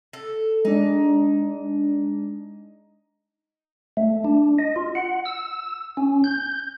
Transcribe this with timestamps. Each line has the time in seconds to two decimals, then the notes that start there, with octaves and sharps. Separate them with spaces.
0.13 A4
0.65 G#3 D4 D#4
3.97 A3
4.25 D4
4.59 D#5
4.76 F4
4.95 F#5
5.25 E6
5.97 C#4
6.24 G6